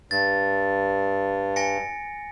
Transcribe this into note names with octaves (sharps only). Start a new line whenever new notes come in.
G2 A6
G#5 A#6 C#7